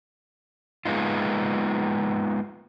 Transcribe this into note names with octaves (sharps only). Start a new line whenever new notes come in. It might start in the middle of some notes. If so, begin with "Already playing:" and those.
G#3 A#3 B3 D#4 F4